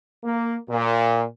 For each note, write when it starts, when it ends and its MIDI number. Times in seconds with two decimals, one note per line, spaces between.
0.24 0.56 58
0.69 1.24 46